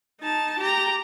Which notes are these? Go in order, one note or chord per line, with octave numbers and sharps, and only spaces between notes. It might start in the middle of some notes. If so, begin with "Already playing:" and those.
D#4 A5
G4 A#5